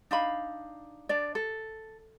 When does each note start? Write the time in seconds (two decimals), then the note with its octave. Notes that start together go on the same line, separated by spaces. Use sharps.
0.11 D4 D#4 F5 B5
1.09 D4 D5
1.35 A4